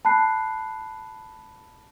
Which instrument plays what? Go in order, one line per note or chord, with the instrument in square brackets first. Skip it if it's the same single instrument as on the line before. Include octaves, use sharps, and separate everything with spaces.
[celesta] A5 B5 F#6 C7